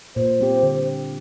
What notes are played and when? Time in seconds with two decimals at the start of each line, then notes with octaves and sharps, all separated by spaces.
0.16 A#2 C5
0.39 G3 C4 G4
0.63 D3